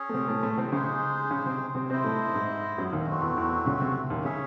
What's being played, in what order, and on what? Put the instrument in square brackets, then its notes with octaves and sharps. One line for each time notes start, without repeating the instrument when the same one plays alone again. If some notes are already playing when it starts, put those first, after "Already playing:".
Already playing: [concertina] C#4 G#4 C#5
[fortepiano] A3
C3 C4
A2 A3
A2 A3
C3 C4
[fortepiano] C#3 C#4 [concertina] G#3 D#4 G#4 C5
[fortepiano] C#3 C#4
C3 C4
C3 C4
[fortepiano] C3 C4 [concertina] E4 C5 D#5
[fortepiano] A2 A3
G#2 G#3
F#2 F#3
D#2 D#3
[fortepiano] D#2 D#3 [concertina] A3 C4 F#4
[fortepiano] E2 E3
E2 E3
C#2 C#3
C3
D#2 D#3
[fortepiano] C#3 [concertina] C#4 G#4 C#5 E5